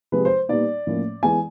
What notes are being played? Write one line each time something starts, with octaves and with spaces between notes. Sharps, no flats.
C3 F3 G#3 B4
C5
A#2 G3 B3 D#4 D5
A2 F3 A#3 C#4
E3 G#3 B3 G#5